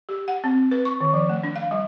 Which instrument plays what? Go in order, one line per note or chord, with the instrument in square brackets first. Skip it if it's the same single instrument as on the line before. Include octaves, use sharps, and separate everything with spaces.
[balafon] G4
F#5
C4
B4
C#6
D#3
F3
A3
D4
F5
G3